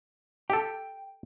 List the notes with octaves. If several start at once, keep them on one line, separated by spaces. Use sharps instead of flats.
G4 A4 G5